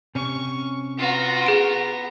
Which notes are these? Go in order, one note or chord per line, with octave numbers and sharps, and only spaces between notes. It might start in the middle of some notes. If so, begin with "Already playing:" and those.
C3 C#4 C#6
B3 F4 F#4 A#5
G#4 D7